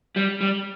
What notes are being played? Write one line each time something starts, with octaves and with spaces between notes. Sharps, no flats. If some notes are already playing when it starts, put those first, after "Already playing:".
G3
G3